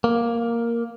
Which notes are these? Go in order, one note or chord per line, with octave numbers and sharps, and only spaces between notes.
A#3